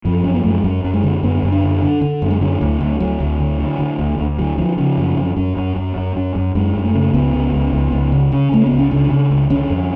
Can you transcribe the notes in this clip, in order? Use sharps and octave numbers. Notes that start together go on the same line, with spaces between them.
F#2 F3
F#2 C#4
B3
F#2 A3
G#3
F#2 F#3
F#2
G#3
D3
F#2 B3
F#2
D4
D3
D3
D3
F#2
G#3
D3 F#3
D2
D2
D2 F#3
D2
D3
D3
D3
D2
D2
D3 F#3
D3 F3
C#3 F3
F#2
F#2
F#2 F#3
F#2
F#2
F#2
F#2
F#2
F#2 G#3
F#2
A3
C#3
C#2 B3
C#3
C#2
C#2
C#2
C#3
C#3 C#4
C#3 A3
C#2 B3
C#4
C#3 D4
C#3
C#2
D3 C#4
F2